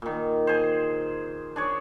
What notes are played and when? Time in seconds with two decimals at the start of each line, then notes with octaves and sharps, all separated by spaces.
0.02 A#2 D#3
0.47 G#4 C5
1.56 D4 G#4 C#5